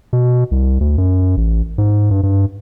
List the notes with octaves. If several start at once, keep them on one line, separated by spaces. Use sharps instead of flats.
B2
C2
D2
F#2
A1
G#2
G2
G2